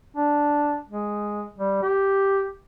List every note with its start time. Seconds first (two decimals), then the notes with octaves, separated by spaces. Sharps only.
0.17 D4
0.90 G#3
1.59 G3
1.82 G4